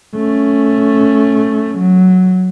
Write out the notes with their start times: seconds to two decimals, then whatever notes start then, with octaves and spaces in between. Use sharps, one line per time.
0.15 A3 C#4
1.78 F#3